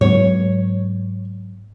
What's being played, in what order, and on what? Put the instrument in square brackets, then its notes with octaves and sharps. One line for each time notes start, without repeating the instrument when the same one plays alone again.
[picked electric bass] G#2 F#3 B3 [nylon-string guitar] C#5